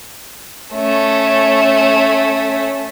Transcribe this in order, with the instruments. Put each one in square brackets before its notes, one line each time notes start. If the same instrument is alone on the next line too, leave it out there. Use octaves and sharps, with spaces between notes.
[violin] A3 C#4